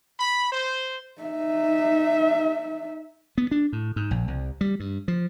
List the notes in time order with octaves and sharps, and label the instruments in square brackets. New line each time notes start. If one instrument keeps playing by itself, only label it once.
[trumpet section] B5
C5
[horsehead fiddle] D#4 E5
[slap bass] B3
D4
A2
G#2
A#1
C2
G3
G2
F3